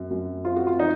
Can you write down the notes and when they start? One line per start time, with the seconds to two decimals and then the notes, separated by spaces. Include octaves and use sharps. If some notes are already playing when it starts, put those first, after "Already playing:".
Already playing: F#2 C4
0.10 F#2
0.45 C4 F4
0.56 F#4
0.67 F4
0.79 F3 D#4